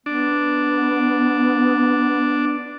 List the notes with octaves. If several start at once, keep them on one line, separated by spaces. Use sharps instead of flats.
B3 D4